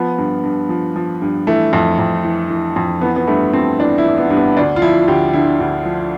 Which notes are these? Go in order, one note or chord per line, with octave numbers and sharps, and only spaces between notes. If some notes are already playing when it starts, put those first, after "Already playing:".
Already playing: F3 B3
G2
G2
F3
F3
G2
E3 A3
F2
F2
E3
E3
F2
E3 B3
B3
G2 A3
G2 C4
E3 D4
E4
E3
B3
G2
B3
D2 D4
F4
F3 E4
D2 G4
D3 E4
D2
F3